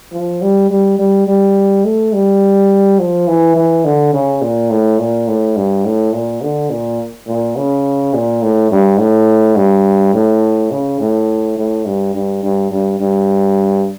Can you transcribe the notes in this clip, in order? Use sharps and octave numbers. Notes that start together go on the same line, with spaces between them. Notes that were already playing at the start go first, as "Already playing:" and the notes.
F3
G3
G3
G3
G3
A3
G3
F3
E3
E3
D3
C#3
A#2
A2
A#2
A2
G2
A2
A#2
D3
A#2
A#2
C#3
A#2
A2
G2
A2
G2
A2
C#3
A2
A2
G2
G2
G2
G2
G2